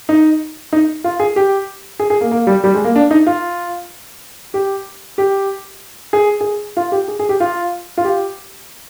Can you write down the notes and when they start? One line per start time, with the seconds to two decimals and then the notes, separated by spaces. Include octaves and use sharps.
0.09 D#4
0.73 D#4
1.04 F4
1.20 G#4
1.36 G4
1.99 G#4
2.10 G#4
2.21 A#3
2.31 A#3
2.47 G3
2.64 G3
2.74 G#3
2.84 A#3
2.96 D4
3.11 D#4
3.26 F4
4.54 G4
5.18 G4
6.13 G#4
6.41 G#4
6.77 F4
6.92 G4
7.08 G#4
7.19 G#4
7.29 G4
7.40 F4
7.98 F4
8.04 G4